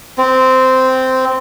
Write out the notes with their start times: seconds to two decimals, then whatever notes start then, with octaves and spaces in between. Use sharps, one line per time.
0.18 C4